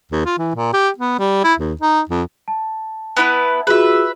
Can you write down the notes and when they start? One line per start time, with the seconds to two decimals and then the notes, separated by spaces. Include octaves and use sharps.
0.12 D#2
0.25 F4
0.38 E3
0.55 A#2
0.73 G4
0.98 B3
1.19 G3
1.44 E4
1.59 D#2
1.81 D#4
2.09 F2
2.48 A5
3.17 B3 E4 B4
3.67 F4 F#4 G#4 B4 E5